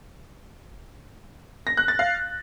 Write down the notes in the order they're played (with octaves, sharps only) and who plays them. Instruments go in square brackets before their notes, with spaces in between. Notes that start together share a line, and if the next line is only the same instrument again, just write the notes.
[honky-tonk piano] A#6
F#6
A6
F5